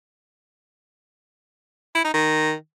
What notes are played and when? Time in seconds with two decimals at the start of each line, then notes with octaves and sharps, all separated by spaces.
1.95 E4
2.04 D#4
2.14 D#3